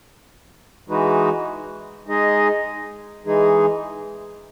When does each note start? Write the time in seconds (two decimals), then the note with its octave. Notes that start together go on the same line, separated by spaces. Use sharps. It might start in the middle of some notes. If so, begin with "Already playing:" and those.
0.88 E3 G#3 D#4 F#4 B4
2.07 G#3 D#4 G#4 D#5
3.25 E3 G#3 D#4 G#4